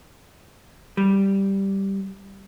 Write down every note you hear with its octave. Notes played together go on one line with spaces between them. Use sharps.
G3